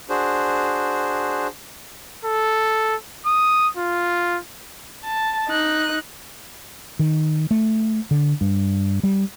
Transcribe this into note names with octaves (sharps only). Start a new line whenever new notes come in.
D4 F#4 G#4 C5
A4
D#6
F4
A5
D#4 F#6
D#3
A3
D3
G2
G3